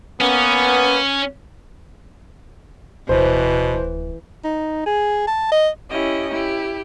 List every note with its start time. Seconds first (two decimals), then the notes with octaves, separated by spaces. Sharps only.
0.21 A#3 B3 C#4
3.09 D1 B2 E3 C5
4.44 D#4
4.86 G#4
5.27 A5
5.52 D#5
5.90 C#4 E4 G4 D#5
6.30 E4 G4